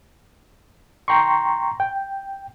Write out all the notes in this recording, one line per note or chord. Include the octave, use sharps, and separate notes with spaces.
G5 A#5 C6 C#6
G5